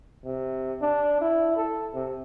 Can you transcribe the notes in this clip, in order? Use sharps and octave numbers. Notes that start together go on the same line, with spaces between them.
C3
D4
E4
A4
C3